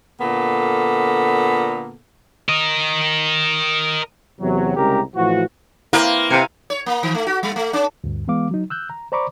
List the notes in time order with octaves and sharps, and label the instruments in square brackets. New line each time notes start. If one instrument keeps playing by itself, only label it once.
[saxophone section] A#2 D3 A#3 B3 A4
[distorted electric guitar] A#4 D#5
[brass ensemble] E2 C3 E3 F#3
C2 C#3 G#3 G4 A#4 A#5
A2 E3 F3 F#4
[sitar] A#3 [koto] C4 B4 F5 [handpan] E4
[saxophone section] C3 [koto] F5 G#5
[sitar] C#5
A#3
D#3
A3
F#4
G3
A3
C#4
[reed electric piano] D2 G2
E3 G#3 B3 F5 D6
F#3 D#4
E6 F#6 G6
A#5
C5 D5 A#5 B5 C#6 D6